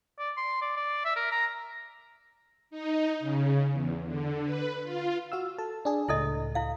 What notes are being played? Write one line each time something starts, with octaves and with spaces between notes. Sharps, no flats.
D5
C6
D5
D5
E5
A#4
A#5
D#4
C#3
E2
D3
B4
F4
F#4 F5 E6
A4 A5
D4 G#4
C#2 A2 E4 A4 D#5
E4 F5